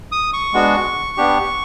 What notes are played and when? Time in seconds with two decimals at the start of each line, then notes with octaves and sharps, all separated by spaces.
0.12 D#6
0.33 C#6
0.53 G#3 B3 D4 F#4
1.17 B3 D4 G4